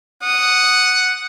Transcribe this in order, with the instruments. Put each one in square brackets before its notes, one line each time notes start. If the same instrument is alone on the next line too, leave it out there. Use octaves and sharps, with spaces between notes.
[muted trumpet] F#5 [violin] D#6